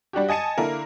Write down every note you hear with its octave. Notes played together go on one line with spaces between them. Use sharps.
G3 D4 F#4 G4
D#5 G#5 A5 C#7 D#7
D3 A#3 E4 A#4